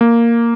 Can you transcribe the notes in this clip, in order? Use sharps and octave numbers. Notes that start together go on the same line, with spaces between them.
A#3